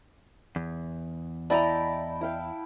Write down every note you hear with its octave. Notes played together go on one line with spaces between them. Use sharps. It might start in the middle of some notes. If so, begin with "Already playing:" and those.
E2
E4 D5 D#5 G5 A5 A#5
E4 F5 G5